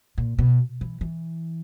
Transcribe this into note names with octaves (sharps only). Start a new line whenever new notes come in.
A#2
B2
E3
E3